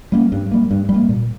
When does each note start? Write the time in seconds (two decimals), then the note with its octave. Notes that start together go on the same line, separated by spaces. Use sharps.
0.12 G3 A#3 C#4
0.32 G2
0.51 G3 A#3
0.71 G2
0.89 G3
0.94 A#3
1.09 A#2